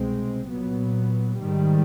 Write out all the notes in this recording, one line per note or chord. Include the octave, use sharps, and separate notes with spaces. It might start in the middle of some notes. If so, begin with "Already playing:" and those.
Already playing: C2 B2 G#3 C4
A#2 F#3 B3
G#2 D#3 G3